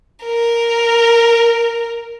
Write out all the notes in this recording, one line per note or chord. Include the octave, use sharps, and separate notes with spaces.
A#4